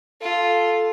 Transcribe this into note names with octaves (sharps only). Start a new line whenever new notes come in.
F4 A4